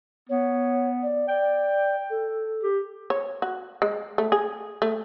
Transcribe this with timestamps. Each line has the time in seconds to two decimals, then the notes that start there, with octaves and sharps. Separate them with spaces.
0.29 B3 C#5
1.03 D5
1.29 D5 G5
2.10 A4
2.63 G4
3.10 C#5
3.42 F#4
3.82 G#3
4.18 A3
4.32 G#4
4.82 A3